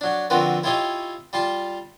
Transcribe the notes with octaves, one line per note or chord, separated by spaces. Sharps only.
F#3 D4
D3 F3 C4 F#4 A#4 B4
E4 F4 G4 C#5 D#5 F5
G3 F4 F5 A5